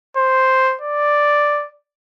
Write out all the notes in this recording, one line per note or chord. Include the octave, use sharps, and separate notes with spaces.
C5
D5